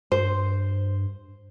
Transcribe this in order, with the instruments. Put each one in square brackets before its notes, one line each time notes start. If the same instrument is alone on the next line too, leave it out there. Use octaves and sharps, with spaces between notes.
[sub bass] G2 [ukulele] C5